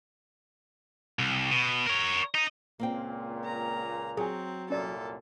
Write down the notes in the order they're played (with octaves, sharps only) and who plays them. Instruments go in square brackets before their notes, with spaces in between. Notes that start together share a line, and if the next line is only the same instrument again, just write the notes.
[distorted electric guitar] C2
B2
A#4 C#5
D#5 A#5
[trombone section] C#2 A#2 [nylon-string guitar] A#3 C4 G5
[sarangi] A#5
[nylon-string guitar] F#3 [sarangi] C4 [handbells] G#4 G#5
[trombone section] C2 F#2 A#2 [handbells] C#4 D5 [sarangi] A4